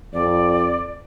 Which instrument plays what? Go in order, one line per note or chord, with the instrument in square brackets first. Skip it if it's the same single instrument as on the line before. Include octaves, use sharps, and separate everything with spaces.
[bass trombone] F2 [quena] D5